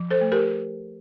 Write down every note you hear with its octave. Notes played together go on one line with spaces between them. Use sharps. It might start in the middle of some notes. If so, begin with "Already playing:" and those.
Already playing: F3
A4 C5
A3
G4 A#4